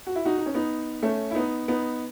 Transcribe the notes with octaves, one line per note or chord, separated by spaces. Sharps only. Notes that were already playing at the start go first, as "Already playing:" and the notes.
F#4
E4
D#4 F#4
D#4
C#4
B3 D#4
A3 C#4
E4
B3 D#4
B3 D#4